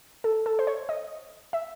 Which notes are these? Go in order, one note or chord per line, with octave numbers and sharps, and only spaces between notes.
A4
A4
C5
C#5
D#5
E5